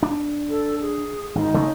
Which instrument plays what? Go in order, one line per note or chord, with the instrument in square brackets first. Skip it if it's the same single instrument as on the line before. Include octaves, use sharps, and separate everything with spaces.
[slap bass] D4
[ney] A4
G#4
[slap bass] G#1 [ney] D#4
[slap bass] C#3 A3 C#4